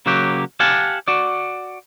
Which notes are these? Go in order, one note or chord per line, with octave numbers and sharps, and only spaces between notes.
C#3 F#3 A#3 F#4 G4
G4 F5 F#5 G#5 A5
F#4 D5